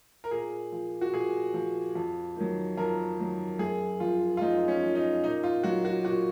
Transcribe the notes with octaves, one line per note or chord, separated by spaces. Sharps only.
A#4
A#2 G#4
F3
F#4
A#2 G#4
F3
F2
D#3 F#3
F2 A#4
D#3 F#3
F#2 G#4
F3 F4
F4
F#2 D#4
C#4
F3
D#4
A#2 D#4
F4
F#3 F#4
F#4
A#2 F#4